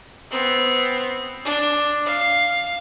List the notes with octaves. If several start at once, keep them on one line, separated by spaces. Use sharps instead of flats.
B3 C4
D4
F5